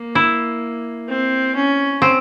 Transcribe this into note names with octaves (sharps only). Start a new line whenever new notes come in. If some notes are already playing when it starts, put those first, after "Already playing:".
Already playing: A#3
E4
C4
C#4
C4